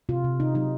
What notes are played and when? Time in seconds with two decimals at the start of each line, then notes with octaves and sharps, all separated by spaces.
0.09 C3 F4
0.24 C3
0.40 C3 D#4
0.55 F#3 D#4